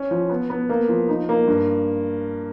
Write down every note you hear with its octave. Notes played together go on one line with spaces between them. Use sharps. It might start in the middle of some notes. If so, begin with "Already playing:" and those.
Already playing: C#4
F3
B3
B3
A#3
F3
D#4
A#3
G2